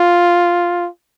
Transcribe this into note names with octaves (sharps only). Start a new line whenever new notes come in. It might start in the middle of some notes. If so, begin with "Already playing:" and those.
Already playing: F4